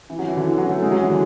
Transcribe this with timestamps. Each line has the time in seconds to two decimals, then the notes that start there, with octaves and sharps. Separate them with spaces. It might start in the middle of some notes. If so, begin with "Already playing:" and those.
0.10 E3
0.19 F#3
0.28 E3
0.37 D3
0.46 E3
0.58 F#3
0.70 A3
0.82 G#3
0.92 F#3
1.01 E3
1.10 D3